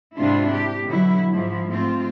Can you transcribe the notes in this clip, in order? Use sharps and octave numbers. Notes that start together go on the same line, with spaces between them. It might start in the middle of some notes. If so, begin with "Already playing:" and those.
G#2 C3 D4 E4 F4
G4
B2 D3 F#3 E4
G#2 F3 E4
G#2 A3 C4 F4